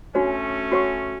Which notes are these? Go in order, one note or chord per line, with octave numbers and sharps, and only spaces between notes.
A3 C#4 D4 F#4 C#5
F#4 C#5 F#5 C#6